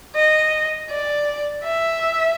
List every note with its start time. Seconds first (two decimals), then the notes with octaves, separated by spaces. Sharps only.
0.15 D#5
0.89 D5
1.63 E5